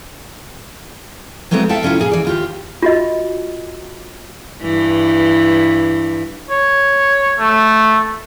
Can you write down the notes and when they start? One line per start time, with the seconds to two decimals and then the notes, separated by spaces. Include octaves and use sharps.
1.51 F#3 G#3 A3 B3 C4
1.69 A4 E5 F5 G5 A5
1.83 C3 C#4 E4 F4
2.00 A#2 G#4 F5
2.11 E3 D5
2.25 D#2 F4 G4
2.82 F4 F#4 D#5
4.62 G2 E3
6.50 C#5
7.39 A3